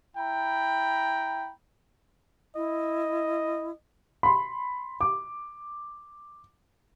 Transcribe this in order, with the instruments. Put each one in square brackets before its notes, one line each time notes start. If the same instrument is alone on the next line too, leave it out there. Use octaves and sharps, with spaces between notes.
[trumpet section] E4 G5 A#5 B5
[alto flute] E4 [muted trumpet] D#5
[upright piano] B5 C6
D6